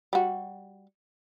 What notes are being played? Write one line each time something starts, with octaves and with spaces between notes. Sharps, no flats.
G3 F#4